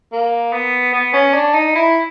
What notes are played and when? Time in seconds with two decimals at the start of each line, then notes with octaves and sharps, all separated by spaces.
0.12 A#3
0.53 B3
0.93 B3
1.14 C#4
1.34 D4
1.54 D#4
1.76 E4